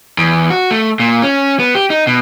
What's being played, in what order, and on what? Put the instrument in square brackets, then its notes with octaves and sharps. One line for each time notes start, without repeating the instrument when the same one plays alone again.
[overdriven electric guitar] E2
F#4
A3
A#2
C#4
B3
G4
D#4
B2